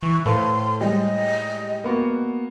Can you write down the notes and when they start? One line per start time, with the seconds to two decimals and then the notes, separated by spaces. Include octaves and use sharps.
0.03 E3 C#6
0.26 A2 A4 B4 C5 F5 C6
0.81 G3 G#3 D#5
1.84 A#3 B3 F#4